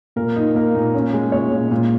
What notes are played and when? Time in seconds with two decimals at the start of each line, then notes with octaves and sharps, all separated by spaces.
0.16 A#2 A#4
0.36 D#4
0.55 A#3 A#4
0.75 A#2
0.94 C#4
1.14 G#3
1.32 A#2 C#5
1.52 A#2
1.71 A#2